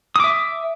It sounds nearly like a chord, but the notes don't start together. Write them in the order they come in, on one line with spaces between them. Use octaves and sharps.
D#6 D6 E5